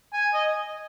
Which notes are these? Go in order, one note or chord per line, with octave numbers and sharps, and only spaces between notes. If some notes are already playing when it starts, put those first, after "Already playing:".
G#5
D#5